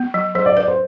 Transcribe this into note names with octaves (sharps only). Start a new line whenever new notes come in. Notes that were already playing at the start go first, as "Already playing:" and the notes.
Already playing: B3
F#3
F#3 C5
D5
B4 D5
C5